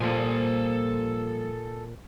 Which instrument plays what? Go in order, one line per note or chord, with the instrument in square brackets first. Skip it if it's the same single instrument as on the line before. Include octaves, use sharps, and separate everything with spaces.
[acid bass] A#2 [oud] F3 G3 A#3 [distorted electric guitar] A4 G#5